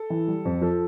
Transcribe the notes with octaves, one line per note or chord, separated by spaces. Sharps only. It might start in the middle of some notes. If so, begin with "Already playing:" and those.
Already playing: A4
E3
G3
F2
F3 A4